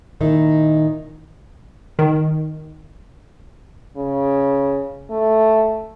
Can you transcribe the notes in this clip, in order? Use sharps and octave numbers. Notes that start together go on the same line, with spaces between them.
A#2 D#3 D#4 E4
D#3
C#3
A3